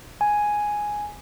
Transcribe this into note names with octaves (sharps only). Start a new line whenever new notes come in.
G#5